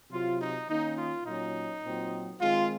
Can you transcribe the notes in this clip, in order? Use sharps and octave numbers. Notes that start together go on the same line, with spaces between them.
C3 F#3 C4 F4
D#4
D#3 A#3 C#4 D#4
F4
A#2 F#3 C#4 D#4
A#2 F#3 C4
D#3 G#3 C4 F4